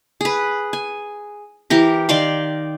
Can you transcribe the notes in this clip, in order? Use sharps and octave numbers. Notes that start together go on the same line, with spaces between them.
G#4 B4
G#5
E3 G4 A#4
D#3 D5 F5 C6